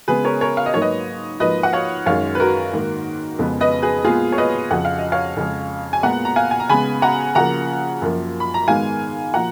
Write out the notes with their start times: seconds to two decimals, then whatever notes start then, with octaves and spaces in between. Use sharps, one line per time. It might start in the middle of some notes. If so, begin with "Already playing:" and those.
0.08 C#3 G#3 B3 G#4 B4
0.24 A#4 C#5
0.41 A#4 C#5
0.57 F5
0.66 D#5
0.74 G#2 F#3 A#3 C#5
0.82 B4 D#5
1.40 G#2 F3 A#3 B4 D#5
1.63 F#5
1.73 C#5 F5
2.06 F#2 D#3 G#3 C#5 F5
2.35 B4
2.40 F#4 A#4
2.73 G#2 D#3 A#3
3.39 F2 C#3 G#3 B3
3.61 B4 D#5
3.82 G#4 B4
4.04 A#2 G#3 B3 F4 G#4
4.32 C#5
4.38 B4 D#5
4.71 F2 C#3 F3 F#5
4.85 F5
4.99 D#5
5.12 C#5 F5
5.37 F2 C#3 G#3
5.93 G#5
6.03 A#2 G#3 B3 F#5 A#5
6.25 A#5
6.36 F5 G#5
6.51 G#5
6.60 A#5
6.69 C#3 G#3 B3 G#5 B5
7.02 F#5 A#5
7.35 C#3 F3 A#3 F#5 A#5
8.02 F#2 F3 A#3
8.40 B5
8.54 A#5
8.68 G#2 D#3 G#3 B3 F5 G#5
9.34 A#2 F3 F#5 A#5